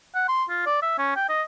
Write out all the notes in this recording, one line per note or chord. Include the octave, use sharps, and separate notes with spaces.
F#5
C6
F4
D5
E5
C#4
G5
D#5